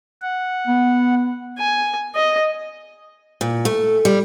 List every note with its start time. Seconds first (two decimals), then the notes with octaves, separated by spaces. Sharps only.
0.22 F#5
0.67 B3
1.58 G#5
2.15 D#5
3.41 A#2
3.65 A3
4.05 G3